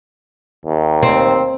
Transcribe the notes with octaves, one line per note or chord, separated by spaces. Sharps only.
D#2
C4